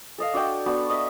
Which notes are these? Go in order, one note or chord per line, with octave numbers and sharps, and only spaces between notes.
A4 D#5 F5
D4 F#4 D5 G5
B3 D4 F#4 A5
D#5 E5